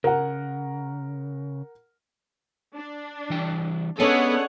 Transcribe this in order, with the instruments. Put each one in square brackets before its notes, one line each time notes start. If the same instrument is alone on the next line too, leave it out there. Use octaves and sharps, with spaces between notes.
[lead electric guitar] C#3 [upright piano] A#4 F#5
[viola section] D4
[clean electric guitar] E3 G3 G5
[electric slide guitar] B3 [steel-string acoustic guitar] C#4 D4 [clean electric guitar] G#4 D#5 [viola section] A4 C#5 F#5